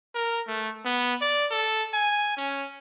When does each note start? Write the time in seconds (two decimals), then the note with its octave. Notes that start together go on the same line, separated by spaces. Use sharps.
0.15 A#4
0.47 A3
0.85 B3
1.21 D5
1.51 A4
1.94 G#5
2.37 C#4